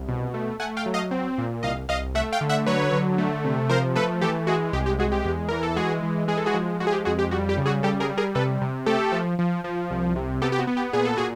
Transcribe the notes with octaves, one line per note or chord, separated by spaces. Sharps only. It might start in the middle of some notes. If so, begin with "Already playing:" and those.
Already playing: C2
B2
A3
A3 F#5 G#5
F5 G5
F#3
D#5 F5
C4
A#2
C2 D#5 F5
C2 D#5 F5
A3 E5 F#5
F5 G5
D3
E5 F#5
F#3 B4 C#5
D3
A3
C3
F3 A#4 C5
A3 A4 B4
E3 G4 A4
G#3 F#4 G#4
C2 G4
G4
G#3 F#4 G#4
G4
E2
E3 A#4
A4
G#3 F#4 G#4
E3
G#3 G#4
A4
F#4 G#4
F3
G#3 F#4
G#4
G4
F2 F#4 G#4
G4
G3 F#4
G4
C#3
F#4 G#4
G3 G4 A4
G#4 A#4
G3
G#4 A#4
C3 A4 B4
C3
A3 G4 A4
F3
F3
F3
C2
C3
B3 G4 A4
G4
F#4
B3
G4
A#2 G#4
A4
A#2 F#4 G#4